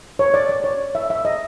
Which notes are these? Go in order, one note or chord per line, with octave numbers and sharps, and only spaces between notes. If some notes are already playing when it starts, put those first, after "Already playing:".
C#5
D5
D5
C#5
E5
E5
D#5